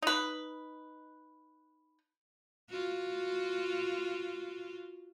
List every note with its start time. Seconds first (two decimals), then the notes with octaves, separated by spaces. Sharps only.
0.02 D#4 B4
2.69 F4 F#4